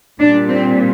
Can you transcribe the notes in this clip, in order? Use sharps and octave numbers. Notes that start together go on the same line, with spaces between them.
A#2 G3 D4
C4